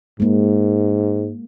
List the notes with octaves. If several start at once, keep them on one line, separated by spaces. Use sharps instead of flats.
G#2 G#3 A#3